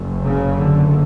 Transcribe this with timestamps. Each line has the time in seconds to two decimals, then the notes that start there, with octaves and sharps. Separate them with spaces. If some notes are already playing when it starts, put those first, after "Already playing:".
Already playing: F#1 F#2
0.27 C#3
0.59 D3